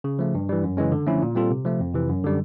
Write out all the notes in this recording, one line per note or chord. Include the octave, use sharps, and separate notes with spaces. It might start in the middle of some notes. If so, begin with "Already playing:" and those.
C#3
F3 A3
G2
E3 G3
F#2
C#3 E3 G#3 C#4
D3
F3 A3 C#4 E4
A#2
G3 C4 F4 A4
C3
F3 A3
F2
C3 E3
F#2
D3 G3